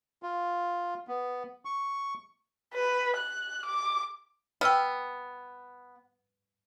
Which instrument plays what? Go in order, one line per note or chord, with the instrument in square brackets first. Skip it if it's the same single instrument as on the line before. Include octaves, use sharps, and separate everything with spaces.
[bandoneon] F4
B3
C#6
[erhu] B4
F#6
D6
[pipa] B3 [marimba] G5 E6 F6